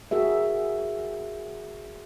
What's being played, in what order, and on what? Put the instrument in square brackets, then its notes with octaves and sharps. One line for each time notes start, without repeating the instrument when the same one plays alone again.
[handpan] F#4 G#4 A#4 E5